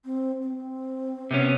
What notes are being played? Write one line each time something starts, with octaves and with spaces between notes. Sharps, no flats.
C4
C4
C3 B3 C#4